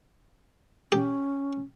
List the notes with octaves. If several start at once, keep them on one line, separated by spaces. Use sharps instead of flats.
C#4 G4